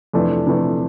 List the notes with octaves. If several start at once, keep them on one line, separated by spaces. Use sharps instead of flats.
F2 C3 E3 A3 D4
F2 C3 E3 A3 D4